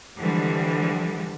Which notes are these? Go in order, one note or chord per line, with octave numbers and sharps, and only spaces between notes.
D3 E3 F3 G3 G#3